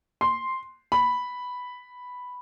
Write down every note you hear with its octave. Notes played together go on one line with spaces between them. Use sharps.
C6
B5